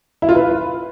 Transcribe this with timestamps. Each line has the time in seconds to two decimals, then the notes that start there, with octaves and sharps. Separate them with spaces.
0.22 E4
0.29 F4
0.35 B4